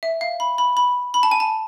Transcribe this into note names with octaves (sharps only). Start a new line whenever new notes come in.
E5
F5
B5
B5
B5
B5
A5
G#5
A5